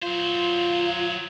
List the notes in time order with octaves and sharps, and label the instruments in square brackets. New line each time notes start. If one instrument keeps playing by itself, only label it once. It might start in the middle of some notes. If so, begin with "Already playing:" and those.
[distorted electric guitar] F#3 C5 [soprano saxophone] F4